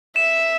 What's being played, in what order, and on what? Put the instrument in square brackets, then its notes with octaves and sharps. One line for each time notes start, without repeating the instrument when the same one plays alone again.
[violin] E5 [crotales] E7